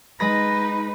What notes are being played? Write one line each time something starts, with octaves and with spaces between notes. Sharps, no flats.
G#3 D#4 B4 B5 A#6